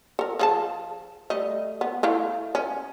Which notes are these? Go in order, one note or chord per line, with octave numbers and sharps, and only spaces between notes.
A4 A#4
F3 G#4 A5
G3 A3 D#5
B3
A3 E4 F5
C#4